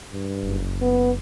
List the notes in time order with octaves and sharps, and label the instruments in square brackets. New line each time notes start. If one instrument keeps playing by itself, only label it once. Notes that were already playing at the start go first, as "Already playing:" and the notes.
[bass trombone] G2
[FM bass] F#1
[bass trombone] B3